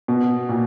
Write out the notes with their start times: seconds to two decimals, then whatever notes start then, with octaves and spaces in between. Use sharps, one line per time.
0.08 B2
0.49 A#2